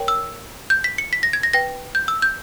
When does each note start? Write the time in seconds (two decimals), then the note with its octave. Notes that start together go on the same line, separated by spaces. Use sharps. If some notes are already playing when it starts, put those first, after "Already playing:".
Already playing: A#4 C#5 G5
0.08 E6
0.70 G6
0.84 B6
0.98 C#7
1.13 B6
1.23 A#6
1.33 G#6
1.43 A#6
1.53 B4 G5 A#6
1.95 G6
2.08 E6
2.22 G6